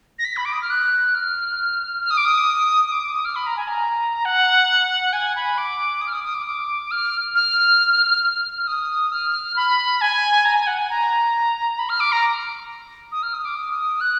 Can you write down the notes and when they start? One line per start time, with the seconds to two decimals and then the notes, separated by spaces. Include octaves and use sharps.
0.19 A#6
0.25 B6
0.37 B5
0.45 D6
0.52 D#6
0.62 F6
0.70 F#6
1.15 F6
2.03 F6
2.11 D#6
2.17 D6
2.25 D#6
2.85 D#6
2.92 D6
3.03 D6
3.14 D#6
3.25 F6
3.35 B5
3.47 A#5
3.57 G#5
3.68 A#5
4.25 F#5
5.13 G#5
5.36 B5
5.58 D6
6.01 D#6
6.07 F6
6.13 D#6
6.24 D#6
6.35 D6
6.47 D6
6.91 F6
7.35 F6
8.23 F6
8.57 F6
8.67 D#6
9.12 F6
9.56 B5
10.01 G#5
10.45 A#5
10.56 G#5
10.67 F#5
10.78 G#5
10.90 A#5
11.79 B5
11.89 F6
12.00 D6
12.12 A#5
13.12 D#6
13.23 F6
13.34 D#6
13.45 D6
13.56 D#6
14.01 F#6